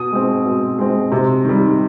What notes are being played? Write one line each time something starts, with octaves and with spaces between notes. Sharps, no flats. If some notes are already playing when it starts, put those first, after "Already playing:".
Already playing: B2 D#6
G#3 C4
B2
G#3 C4
C3
D#3 G3